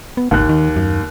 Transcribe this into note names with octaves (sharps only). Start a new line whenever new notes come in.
B3
G#1 D#2 F#6
D#3
F#2